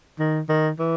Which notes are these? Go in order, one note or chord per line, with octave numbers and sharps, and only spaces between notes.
D#3
D#3
E3